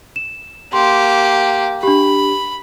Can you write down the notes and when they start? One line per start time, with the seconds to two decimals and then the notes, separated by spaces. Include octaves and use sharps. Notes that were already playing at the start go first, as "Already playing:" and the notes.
0.16 E7
0.73 A#3 G4 C6
1.83 D4 G4 B5